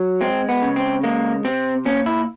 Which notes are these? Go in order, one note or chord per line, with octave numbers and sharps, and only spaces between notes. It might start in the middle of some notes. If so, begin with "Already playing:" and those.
Already playing: F#3
G#3 C4
B3
C#3
C4
G#3 A#3
C3 C4
A#2 C#4
E4